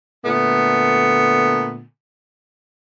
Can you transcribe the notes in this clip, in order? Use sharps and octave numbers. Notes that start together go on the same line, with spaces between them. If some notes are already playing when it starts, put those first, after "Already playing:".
A#2 D3 A3 B3